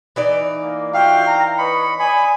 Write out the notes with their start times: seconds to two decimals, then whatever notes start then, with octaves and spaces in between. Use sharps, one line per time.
0.16 E3 D#4 D5
0.62 A#3
0.94 F4 F#4 E5 F5 G5
1.25 A#5
1.58 B4 C#5 D#5 B5 C#7
1.99 D5 G#5 B5 D#6